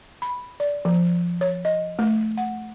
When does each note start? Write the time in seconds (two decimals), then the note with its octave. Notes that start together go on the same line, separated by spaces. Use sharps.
0.22 B5
0.60 D5
0.85 F3
1.41 C#5
1.65 D#5
1.99 A3
2.37 F#5